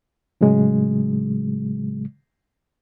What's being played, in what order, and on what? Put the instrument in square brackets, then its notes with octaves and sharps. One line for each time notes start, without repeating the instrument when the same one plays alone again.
[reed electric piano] A2 C#3 F#3 G#3